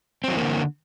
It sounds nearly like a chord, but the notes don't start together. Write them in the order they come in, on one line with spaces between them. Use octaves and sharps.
C4 F#3 E3 A#3 D3